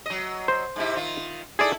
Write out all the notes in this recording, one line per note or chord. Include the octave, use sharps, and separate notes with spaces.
F#3 D#5
C5
G#2 C3 E4
D#3 F4
D#4 E4 G#4 A4 D5